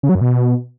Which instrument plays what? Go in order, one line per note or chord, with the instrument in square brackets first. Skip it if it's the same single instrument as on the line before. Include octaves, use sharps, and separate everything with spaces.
[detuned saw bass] C#3
F#3
F#2
B2